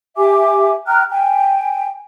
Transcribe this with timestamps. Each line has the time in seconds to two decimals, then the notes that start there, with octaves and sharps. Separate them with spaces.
0.17 G4 E5 G#5 D6
0.87 G5 A#5 F6 F#6
1.11 G5 G#5